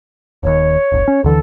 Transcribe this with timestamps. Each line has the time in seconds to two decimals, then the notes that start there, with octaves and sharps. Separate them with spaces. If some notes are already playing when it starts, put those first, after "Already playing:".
0.43 D#1 D#2 C#5
0.92 D1 G1
1.08 C#4
1.24 D2 D3 E3 A4